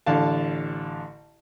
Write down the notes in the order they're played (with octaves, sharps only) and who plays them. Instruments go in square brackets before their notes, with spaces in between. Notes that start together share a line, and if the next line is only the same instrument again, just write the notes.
[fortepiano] A1 D3 F5 A5